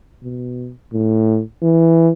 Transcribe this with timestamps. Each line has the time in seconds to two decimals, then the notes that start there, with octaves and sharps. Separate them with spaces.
0.23 B2
0.93 A2
1.62 E3